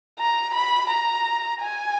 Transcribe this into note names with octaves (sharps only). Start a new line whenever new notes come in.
A#5
B5
A#5
G#5